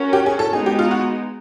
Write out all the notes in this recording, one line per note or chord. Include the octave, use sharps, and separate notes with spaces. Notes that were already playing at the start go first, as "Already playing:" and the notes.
Already playing: C#4 F#4 A#4
G4
G#4
A4
G#3 B3 D#4 G#4
G4
F4
F#4